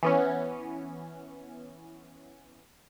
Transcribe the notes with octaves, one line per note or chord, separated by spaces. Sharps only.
E3 B3 C#4